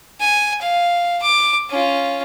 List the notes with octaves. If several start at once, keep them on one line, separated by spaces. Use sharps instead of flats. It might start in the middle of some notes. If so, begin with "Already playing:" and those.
G#5
F5
D6
C#4 F4